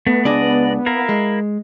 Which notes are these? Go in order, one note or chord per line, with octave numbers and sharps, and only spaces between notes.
A3 B3
C#2 D4 G#4 D5 D#5
E4 A#4 F5
G#3